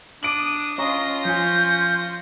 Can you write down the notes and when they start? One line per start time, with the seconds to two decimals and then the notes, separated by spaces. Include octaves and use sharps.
0.23 D4 D6 D#6 D7 F#7
0.78 C#4 F4 D#5 A#5 C#6 A#6
1.25 F3 C#4 G#5 G6